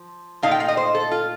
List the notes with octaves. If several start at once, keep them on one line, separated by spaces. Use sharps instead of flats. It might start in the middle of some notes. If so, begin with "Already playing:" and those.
Already playing: F3
A#2 A3 D#4 F5
G5
F5
D#5
C5
A4
F4